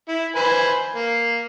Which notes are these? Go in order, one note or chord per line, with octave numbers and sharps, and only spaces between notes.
E4
B4 C5 G#5
A#3